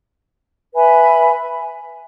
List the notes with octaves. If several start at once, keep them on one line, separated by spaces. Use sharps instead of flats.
B4 E5 G#5 B5